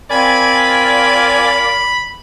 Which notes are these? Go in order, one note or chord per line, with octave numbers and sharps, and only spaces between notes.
C4 F4 A#4 D5 G#5 B5